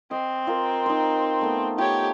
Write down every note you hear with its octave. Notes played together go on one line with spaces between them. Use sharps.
C4 D#5
F4 A#4
D#4 C5
A3 B3
F4 G4 C#5 G5